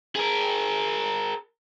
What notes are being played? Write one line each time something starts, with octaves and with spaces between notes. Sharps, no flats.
G#4 A#4